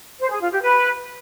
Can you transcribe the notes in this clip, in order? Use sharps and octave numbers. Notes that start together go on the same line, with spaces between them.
C5
G#4
F4
G4
B4